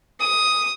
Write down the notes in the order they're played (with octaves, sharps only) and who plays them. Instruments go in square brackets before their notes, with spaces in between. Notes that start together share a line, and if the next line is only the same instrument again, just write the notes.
[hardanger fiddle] D#6